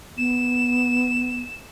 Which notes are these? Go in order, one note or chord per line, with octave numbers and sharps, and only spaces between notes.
B3 E7